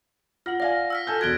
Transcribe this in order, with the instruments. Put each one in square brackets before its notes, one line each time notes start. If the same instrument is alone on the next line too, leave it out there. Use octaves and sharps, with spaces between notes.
[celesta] F4 F#5 F#7 [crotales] F6 [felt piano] A#6
[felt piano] D5 F5 G#5 [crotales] A#6
[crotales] E6 F6 B6
[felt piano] A4 G#5 G6
[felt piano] E1 F#6 [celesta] F#4 A6 [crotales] G#6 D7 G7